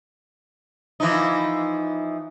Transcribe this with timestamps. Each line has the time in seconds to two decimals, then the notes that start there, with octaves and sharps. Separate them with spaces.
1.00 E3 F3 D#4